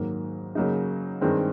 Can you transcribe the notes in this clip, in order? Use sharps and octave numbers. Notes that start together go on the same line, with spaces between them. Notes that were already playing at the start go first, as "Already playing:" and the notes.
Already playing: G#2 D#3 F#3 A#3
C#3 F#3 A#3 D#4
G2 D#3 G#3 C4